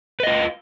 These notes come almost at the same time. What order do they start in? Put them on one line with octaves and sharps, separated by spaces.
B4 D#5 F4